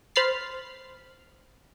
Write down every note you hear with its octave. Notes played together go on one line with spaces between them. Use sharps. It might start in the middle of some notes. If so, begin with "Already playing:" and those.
C5 B5 F6 A6 C7